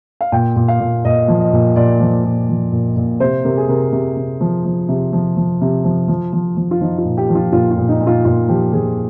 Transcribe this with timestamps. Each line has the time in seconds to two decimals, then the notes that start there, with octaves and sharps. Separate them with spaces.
0.21 F5
0.32 A#2 G5
0.56 A#2
0.68 F5
0.80 A#2
1.05 A#2 D#5
1.28 F3
1.40 D#5
1.53 A#2
1.76 A#2 D5
2.00 F3
2.24 A#2
2.49 F3
2.72 A#2
2.96 A#2
3.20 C3 C5
3.45 C3 A#4
3.57 G#4
3.68 C3 A#4
3.92 C3
4.16 C3
4.41 F3
4.65 F3
4.89 C3
5.13 F3
5.37 F3
5.61 C3
5.84 F3
6.08 F3
6.33 F3
6.57 F3
6.71 F4
6.81 F3 D#4
6.98 F4
7.05 A#2
7.17 G4
7.29 F3
7.35 F4
7.52 A#2 F4
7.71 F4
7.77 A#2
7.89 D#4
8.01 A#2
8.07 F4
8.25 A#2 F4
8.48 F3 G4
8.73 F3 G#4